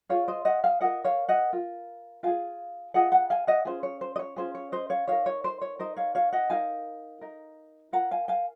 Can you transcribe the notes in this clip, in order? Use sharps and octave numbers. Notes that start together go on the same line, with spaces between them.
F4 G#4 C#5 F5
C5 D#5
D#5 F#5
F5 G#5
F4 A#4 D#5 F#5
C#5 F5
D#5 F#5
F4 A#4
F4 G#4 F5 G#5
F4 G#4 D#5 F#5
F#5 A#5
F5 G#5
D#5 F#5
C#4 F4 G#4 C5
C#5
C5
D#5
C#5
C#4 F4 G#4 C5
C#5
C5 D#5
C#5 F5
D#4 A#4 C#5 F5
C#5
C5
C#5
D#4 A#4 C5 D#5
C#5 F5
C#5 F5
D#5 F#5
D#4 A#4 F5 G#5
D#4 A#4
F4 A#4 F#5 A#5
F5 G#5
F5 G#5